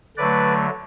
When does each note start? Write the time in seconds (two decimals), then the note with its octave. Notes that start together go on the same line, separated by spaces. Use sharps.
0.17 D3 F#3 A3 B4 D5